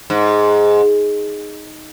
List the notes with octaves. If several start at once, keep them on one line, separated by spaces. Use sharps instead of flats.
G#2